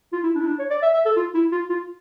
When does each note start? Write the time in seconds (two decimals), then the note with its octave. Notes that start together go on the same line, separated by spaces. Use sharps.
0.13 F4
0.24 E4
0.35 D4
0.41 E4
0.47 D4
0.59 C#5
0.70 D5
0.82 E5
0.94 E5
1.06 A4
1.16 F4
1.34 E4
1.52 F4
1.70 F4